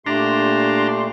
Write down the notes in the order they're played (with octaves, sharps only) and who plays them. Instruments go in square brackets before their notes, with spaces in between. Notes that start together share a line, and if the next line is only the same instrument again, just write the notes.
[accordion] A#2 A3 [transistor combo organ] D4 A#5 [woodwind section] G4 C6